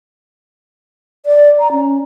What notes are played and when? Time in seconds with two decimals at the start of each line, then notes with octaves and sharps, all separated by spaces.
1.26 D5
1.59 A#5
1.72 C#4